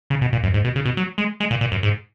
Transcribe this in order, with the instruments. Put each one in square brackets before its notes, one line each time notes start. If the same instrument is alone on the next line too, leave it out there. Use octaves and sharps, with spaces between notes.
[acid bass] C#3
B2
A#2
F#2
G#2
B2
C#3
B2
F#3
G#3
G#3
A#2
A#2
F#2
G#2